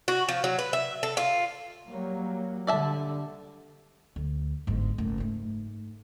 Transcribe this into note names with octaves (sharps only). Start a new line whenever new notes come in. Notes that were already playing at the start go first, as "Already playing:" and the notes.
F#4
F3
F#3
B4
E5
A4
F4
F#3 G3 A#3
D3 G3 D5 E5 A5
D2
G1 G#2
F#1 A3
G#2 A3